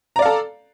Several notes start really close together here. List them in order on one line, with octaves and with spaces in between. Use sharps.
A#5 D5 F5 A4